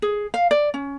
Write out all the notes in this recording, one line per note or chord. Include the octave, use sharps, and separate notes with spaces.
G#4
F5
D5
C#4